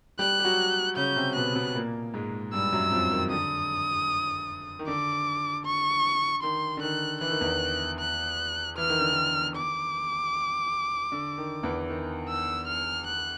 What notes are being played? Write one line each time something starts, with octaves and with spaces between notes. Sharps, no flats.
G3 G4 F#6
G4
F#3 F#4
C#3 C#4 G6
C3 C4
B2 B3 F#6
B2 B3
A#2 A#3
G#2 G#3
G2 G3 E6
F#2 F#3
F2 F3
D#3
D3 D#6
D#3
D3 D6
C#6
D#3 C6
D3
D#3 F#6
E3 F#6
D#3
E2 E3
F#6
E3 F6
D#3
D3
D#3
D6
D3
D#3
E2 E3
D#3
E6
F6
F#6